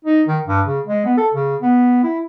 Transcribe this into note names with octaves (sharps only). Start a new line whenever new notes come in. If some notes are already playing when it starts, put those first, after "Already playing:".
D#4
D#3
G2
C#3
G#3
B3
A4
C#3
B3
E4